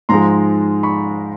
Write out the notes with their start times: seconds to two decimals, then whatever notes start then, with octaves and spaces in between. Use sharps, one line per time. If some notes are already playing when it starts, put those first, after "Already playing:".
0.09 G#2 F3 G#3 A#5 C6
0.83 B5 C#6